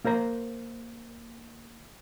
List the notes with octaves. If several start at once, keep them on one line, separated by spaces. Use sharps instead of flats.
A#3 A#4 C5 A#5